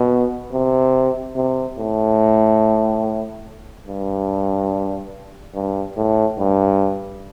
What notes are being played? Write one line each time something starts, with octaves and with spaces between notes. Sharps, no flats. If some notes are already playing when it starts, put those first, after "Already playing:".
Already playing: B2
C3
C3
A2
G2
G2
A2
G2